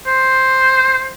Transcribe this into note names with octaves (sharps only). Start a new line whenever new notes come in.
C5